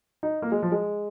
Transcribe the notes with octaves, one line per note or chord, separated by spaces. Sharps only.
D#4
A#3
G#3
F3
G#3